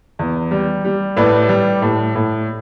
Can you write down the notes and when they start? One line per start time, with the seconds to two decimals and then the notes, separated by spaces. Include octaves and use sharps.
0.19 E2
0.51 G3
0.85 G3
1.17 A2 B4 D5
1.49 G3
1.82 A2
2.15 A2